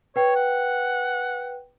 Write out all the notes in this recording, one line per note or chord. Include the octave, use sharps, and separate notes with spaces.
B4 C#5 G5
F#5